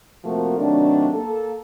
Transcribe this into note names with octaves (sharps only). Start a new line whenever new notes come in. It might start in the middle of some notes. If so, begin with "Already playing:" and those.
C3 F3 A3 A#3 F#4 A#4
C3 D#3 F#3 A3 D4
A#3 A4